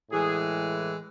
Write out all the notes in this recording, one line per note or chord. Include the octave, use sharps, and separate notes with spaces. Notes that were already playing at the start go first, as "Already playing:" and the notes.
A2 E3 G#3 G#4